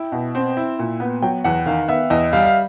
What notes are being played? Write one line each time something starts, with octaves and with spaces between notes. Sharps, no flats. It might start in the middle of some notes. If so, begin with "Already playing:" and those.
Already playing: E4 G5
B2
C4
E4
A#2
B3
F#3 G5
E2 F#5
D#3 F5
B3 E5
E2 D#5
G3 F5
F5